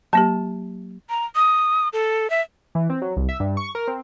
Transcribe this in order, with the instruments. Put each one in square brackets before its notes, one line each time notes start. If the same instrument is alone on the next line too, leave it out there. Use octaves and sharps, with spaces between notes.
[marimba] F#3 A#3 G4 [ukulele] A5
[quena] A#5
D#6
A4
E5
[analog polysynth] E3
C4
F#3
C2
E5
G2
C#6
A#4
C4